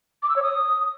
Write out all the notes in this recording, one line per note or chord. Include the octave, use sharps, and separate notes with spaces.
D6
E6
C#5
D#6